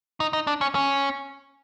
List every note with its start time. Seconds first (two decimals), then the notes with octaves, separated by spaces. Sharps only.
0.20 D#4
0.33 D#4
0.47 D4
0.61 C#4
0.75 C#4